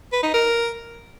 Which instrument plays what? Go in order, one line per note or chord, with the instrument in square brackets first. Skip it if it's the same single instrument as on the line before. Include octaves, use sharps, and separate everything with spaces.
[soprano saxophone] B4
D#4
A#4